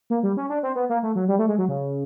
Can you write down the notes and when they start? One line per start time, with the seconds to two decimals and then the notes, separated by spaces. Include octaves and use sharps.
0.10 A#3
0.23 G3
0.37 C#4
0.49 D4
0.63 C4
0.76 B3
0.89 A#3
1.03 A3
1.15 F#3
1.28 G3
1.39 A3
1.48 G#3
1.58 F#3
1.69 C#3